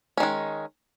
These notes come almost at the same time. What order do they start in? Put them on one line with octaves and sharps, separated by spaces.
C#4 D#3 G#3